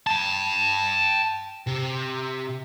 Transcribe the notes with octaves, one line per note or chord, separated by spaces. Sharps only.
G5 A5
C3